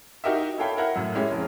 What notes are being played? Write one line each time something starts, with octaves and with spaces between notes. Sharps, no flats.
D#4 F#4 G4 A#4 D#5 E5
E4 A4 C#5 F5 G5 B5
E4 A#4 F#5
F#2 A2
G#3 C#4 E4 G4
F1